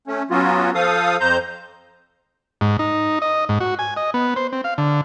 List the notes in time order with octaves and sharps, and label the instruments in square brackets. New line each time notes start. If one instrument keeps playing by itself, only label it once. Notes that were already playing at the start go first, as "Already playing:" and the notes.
[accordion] A3 C#4
F#3 B3 C#4 F4 F#4
F3 A4 F5 D#6
F2 C5 A#5 G6
[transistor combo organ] G#2
D#4
D#5
G#2
F#4
G#5
D#5
B3
C5
C4
F5
D3